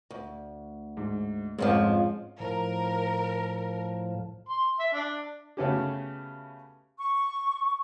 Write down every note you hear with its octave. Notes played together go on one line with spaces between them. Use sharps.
D2
G#2
F2 G#2 F3 G#3 C#4
A2 F3 A#4
C6
E5
D4
C#3 A3 B3 C#4 F#4 G4
C#6